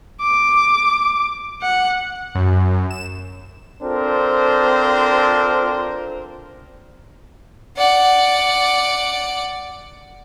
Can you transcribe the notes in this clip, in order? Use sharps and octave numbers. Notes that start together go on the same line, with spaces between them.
D6
F#5
F#2
E7
C4 D4 F4 A4 A#4 C5
D5 F#5